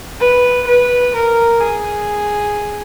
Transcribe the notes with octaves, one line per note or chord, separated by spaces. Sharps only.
B4
B4
A#4
G#4